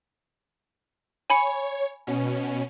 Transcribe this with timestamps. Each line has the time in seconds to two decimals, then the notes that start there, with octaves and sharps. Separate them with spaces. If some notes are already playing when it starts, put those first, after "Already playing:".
1.30 C#5 G#5 B5 C#6 C#7
2.07 B2 C#4